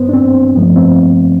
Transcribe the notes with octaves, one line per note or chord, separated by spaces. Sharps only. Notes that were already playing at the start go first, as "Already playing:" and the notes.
Already playing: G2 B3 C5
D4
C4
G2 F3 A3 B3
C4